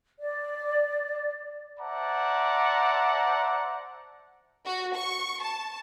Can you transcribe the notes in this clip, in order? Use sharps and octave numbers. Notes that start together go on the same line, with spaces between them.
D5
C5 D5 E5 F#5 A5 A#5
F#4
C#6
A5